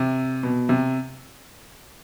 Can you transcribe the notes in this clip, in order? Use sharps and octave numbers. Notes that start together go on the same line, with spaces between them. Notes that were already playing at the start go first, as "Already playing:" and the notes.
Already playing: C3
B2
C3